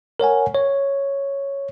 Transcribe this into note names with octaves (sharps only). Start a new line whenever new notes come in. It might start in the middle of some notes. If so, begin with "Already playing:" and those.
A#4 C#5 F#5 G#5
C#5